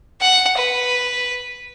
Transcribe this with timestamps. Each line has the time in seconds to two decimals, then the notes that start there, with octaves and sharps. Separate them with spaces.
0.21 F#5
0.57 B4